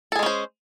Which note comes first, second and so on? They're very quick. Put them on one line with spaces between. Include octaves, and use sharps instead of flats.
A4 G#4 G#3 C#4 C5